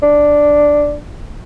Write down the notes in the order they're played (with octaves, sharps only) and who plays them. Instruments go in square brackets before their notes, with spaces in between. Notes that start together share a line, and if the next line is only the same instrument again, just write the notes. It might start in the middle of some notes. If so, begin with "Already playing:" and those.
[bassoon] D4